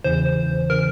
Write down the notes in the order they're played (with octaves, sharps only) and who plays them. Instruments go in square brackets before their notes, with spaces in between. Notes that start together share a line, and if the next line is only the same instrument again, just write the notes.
[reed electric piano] E2 C#3 E3 [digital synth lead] C5
[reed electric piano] C#3 E3 [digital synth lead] A#4